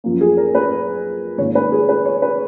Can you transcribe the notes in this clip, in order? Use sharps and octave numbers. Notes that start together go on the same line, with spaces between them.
F#2 F3 A#3
G#4
A#4
B4
G#2 D#3 A#3 C#5
B4
G#4
B4
C#5
B4